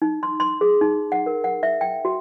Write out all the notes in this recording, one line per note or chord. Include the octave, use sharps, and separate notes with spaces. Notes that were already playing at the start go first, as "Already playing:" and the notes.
D#4
C6
C6
G#4
D#4
F#5
A#4
F#5
E5
G5
F#4